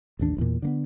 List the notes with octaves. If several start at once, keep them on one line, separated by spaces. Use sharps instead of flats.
A1 D#2 D4
A1 E2 A#2
D3 A#3 B3